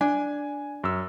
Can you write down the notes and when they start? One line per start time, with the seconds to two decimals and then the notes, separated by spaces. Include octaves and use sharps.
0.01 D4 G#5
0.84 F#2 E6